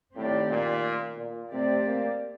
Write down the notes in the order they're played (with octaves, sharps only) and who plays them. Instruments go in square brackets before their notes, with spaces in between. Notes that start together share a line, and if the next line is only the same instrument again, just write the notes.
[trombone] A2 [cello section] D#3 A3 C4 G4 D5
[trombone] A#2
A#2
[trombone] C3 [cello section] A3 C4 G4 D5
[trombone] A#3